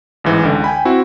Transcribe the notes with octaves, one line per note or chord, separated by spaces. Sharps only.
A1 G#2 E3
C#2 D3
G5 G#5 B5
C4 E4 F#4